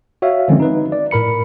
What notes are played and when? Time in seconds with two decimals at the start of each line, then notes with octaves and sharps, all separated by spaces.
0.22 F#4 C#5 E5 F5
0.48 D3 D#3 F3 G#3 C4 C#4
0.60 D#4 B4
0.92 D5
1.11 A2 A#4 B5 C#7